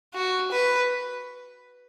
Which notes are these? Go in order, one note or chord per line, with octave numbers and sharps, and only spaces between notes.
F#4
B4